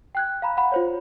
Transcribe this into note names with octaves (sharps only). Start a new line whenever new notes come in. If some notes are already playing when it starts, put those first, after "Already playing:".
G5 F#6 G#6
F5 A#5 B5
F#5 B5
F4 C5 C#5